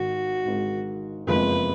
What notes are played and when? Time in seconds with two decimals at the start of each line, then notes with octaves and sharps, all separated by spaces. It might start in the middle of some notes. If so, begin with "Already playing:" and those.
Already playing: G#1 G#2 D#3 F#4
0.45 G#1 G#2 D#3
1.27 F#1 F2 F3 G#3 B3 B4